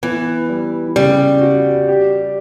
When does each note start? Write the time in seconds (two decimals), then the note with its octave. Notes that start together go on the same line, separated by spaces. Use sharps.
0.03 E3 B3
0.49 G3
0.96 C#3 G3
1.41 F#4
1.88 G4